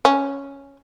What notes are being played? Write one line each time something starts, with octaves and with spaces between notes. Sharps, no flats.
C#4